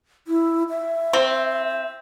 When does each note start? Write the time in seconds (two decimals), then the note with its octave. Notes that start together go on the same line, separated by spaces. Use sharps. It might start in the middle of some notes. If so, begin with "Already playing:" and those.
0.28 E4
0.69 E5
1.13 C4